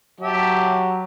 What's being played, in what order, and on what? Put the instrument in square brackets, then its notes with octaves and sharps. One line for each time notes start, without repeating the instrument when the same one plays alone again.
[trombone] F#3 [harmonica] G4 E5 A5